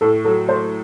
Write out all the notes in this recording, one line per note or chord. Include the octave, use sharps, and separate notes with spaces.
A2 A4
F#3 A4
A3 C5